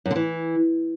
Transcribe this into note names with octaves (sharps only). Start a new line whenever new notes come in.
F#2
D3
E3